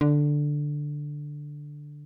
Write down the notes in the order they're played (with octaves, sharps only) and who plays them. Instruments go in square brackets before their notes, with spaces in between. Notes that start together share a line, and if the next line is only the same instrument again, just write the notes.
[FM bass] D3